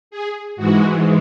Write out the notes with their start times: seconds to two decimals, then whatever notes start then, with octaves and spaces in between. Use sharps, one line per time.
0.11 G#4
0.56 G#2 E3 G#3 F#4